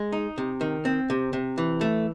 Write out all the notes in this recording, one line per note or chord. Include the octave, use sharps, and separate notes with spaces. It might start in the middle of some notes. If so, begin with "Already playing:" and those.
Already playing: G#3
D#4
C3
D#3
C4
C3
C3
E3
A3